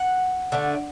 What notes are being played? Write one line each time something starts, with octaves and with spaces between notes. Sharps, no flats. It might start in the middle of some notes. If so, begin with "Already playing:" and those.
Already playing: F#5
D3 A3 D4